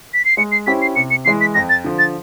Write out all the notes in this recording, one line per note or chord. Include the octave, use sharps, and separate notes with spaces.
B6
C7
G#3 C#7
C7
C#4 E4 G4 C5 B6
C7
C3 C#7
C#7
E3 G#3 C7
B6
F2 A#6
A6
D3 F3
A6